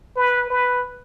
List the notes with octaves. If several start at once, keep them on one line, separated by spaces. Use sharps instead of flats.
B4
B4